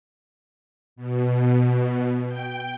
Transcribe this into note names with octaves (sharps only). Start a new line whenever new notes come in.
B2
G5